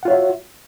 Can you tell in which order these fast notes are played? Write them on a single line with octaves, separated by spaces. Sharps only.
F#5 F4 C#5 E5 F#4